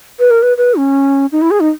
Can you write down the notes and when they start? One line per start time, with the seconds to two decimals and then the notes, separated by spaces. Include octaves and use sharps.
0.19 B4
0.30 A#4
0.42 B4
0.57 B4
0.76 C#4
1.32 D#4
1.41 E4
1.51 G#4
1.60 D#4